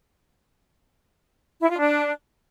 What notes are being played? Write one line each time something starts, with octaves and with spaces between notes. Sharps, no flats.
E4
F4
D4